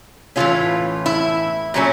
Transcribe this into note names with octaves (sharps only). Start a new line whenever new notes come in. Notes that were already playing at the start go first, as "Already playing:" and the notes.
A2 E3 G#3 C#4 F4
E4
A#2 F#3 A3 C#4